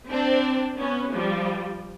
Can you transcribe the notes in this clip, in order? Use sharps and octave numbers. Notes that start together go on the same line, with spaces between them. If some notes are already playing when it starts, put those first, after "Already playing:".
C4 D4
B3 C#4
F3 G3